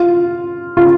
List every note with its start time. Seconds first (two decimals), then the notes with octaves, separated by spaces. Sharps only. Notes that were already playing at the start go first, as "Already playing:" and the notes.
Already playing: F4
0.77 F4